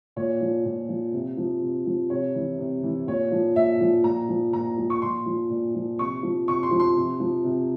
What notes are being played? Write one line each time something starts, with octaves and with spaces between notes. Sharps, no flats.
A#2 C#5
F3
A#2
F3
C3
F3
C3
F3
C3 C#5
E3
C3
E3
A#2 C#5
F3
A#2 E5
F3
A#2 A#5
F3
A#2 A#5
F3
C#6
A#2 C6
F3
A#2
F3
C3 C#6
F3
C3 C#6
C6
F3
C6
C3
F3
C3